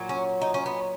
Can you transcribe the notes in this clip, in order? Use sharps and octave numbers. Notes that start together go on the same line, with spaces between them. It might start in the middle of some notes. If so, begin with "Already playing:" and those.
Already playing: A#2 F#3
C#4
D#4
C#4
B3